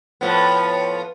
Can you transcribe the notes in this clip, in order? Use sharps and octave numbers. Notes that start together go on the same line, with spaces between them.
A2 F3 B3